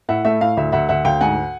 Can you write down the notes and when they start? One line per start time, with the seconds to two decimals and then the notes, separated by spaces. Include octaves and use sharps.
0.09 A2 E5 F#5
0.25 A3 E5
0.41 A2 F5
0.57 D2 E5
0.72 D2 E5 F#5
0.89 D2 E5 F#5
1.04 D2 F5 G5
1.21 G#2 F#5 G#5